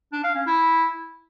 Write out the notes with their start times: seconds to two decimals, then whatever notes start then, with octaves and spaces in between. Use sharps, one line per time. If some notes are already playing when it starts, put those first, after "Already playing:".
0.12 D4
0.24 F5
0.35 C#4
0.46 E4